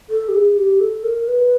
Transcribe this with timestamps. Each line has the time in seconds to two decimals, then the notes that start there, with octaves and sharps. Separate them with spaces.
0.10 A4
0.29 G4
0.33 G#4
0.57 G4
0.80 A4
1.04 A#4
1.28 B4